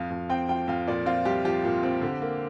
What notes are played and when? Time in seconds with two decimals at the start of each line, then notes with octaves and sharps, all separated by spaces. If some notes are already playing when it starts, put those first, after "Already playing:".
Already playing: F2 F3 F5
0.10 F2
0.29 C4 G5
0.49 F3 G5
0.68 F2 F5
0.87 A#2 D5
1.06 C4 F4
1.25 C2 G4
1.45 F3 G4
1.64 A#2
1.83 C4
2.02 D3
2.22 A#3